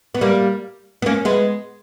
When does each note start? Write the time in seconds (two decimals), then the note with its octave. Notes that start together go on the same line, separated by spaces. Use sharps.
0.15 B3
0.21 G3 A#3
1.02 B3
1.06 A#3 C#4
1.25 G#3 B3